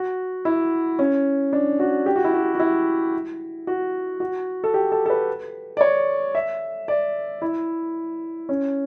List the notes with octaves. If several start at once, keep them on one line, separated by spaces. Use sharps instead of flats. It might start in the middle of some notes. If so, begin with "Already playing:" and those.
Already playing: F#4
E4
C#4
D4
F#4
G4
F#4
E4
F#4
F#4
E4
F#4
F#4
A4
G4
A4
A4
B4
D5
C#5
E5
D5
E4
C#4